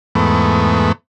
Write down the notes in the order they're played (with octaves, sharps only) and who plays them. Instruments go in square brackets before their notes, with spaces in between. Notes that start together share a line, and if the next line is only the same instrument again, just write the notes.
[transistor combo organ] E2 G#2 A3 B3